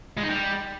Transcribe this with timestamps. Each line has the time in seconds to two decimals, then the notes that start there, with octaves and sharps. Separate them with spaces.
0.17 G#3
0.23 D#4
0.29 G3